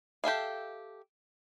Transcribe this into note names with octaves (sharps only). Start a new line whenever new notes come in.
G4 A4 E5 F5